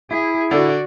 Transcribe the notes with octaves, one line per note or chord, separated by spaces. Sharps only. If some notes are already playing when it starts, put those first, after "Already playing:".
E4 G#4
D3 F#4 D5